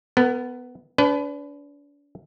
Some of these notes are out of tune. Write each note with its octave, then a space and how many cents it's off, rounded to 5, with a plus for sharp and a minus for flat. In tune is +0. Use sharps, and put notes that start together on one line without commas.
B3 +10 A#4 -30
D4 -40 B4 +25